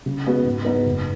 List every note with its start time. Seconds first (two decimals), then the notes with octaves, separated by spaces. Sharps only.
0.06 C#3
0.26 G#3 B3 F#4
0.45 G#2
0.65 G#3 B3 D#4 B4
0.86 F#1